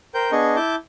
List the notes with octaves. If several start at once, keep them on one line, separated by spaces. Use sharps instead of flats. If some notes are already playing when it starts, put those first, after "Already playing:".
A#4 C5 G5 G6
B3 D4 G#4 D#5 C#6
E4 A5 D6 G6